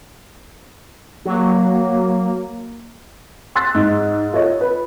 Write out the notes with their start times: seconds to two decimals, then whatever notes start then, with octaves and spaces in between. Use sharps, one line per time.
1.25 F#3 A#3
3.55 C6 E6 F#6 A6 B6
3.75 G#2
4.33 F4 A4 C#5 D#5
4.61 B4